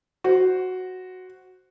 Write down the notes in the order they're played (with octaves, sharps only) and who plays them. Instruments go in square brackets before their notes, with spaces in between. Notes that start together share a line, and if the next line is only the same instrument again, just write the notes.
[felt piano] F#4 C5